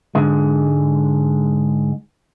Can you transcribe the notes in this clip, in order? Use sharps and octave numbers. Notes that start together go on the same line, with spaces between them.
G#2 D3 G#3